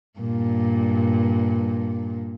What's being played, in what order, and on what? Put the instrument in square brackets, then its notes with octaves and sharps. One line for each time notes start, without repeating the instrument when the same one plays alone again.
[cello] G2 A#2